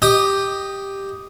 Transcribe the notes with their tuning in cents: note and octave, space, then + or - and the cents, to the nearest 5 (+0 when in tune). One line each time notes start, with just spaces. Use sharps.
G4 +0 D#5 +0 D#6 -30